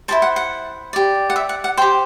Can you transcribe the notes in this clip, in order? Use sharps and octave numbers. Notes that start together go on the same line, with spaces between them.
E4 G4 C5 A5
F#5
F#5
G4 D5
F#5
E5
F#5
F#5
G4 C5 G5